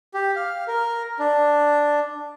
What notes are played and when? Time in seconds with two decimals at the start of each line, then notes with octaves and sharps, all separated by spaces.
0.14 G4
0.36 F5
0.68 A#4
1.19 D4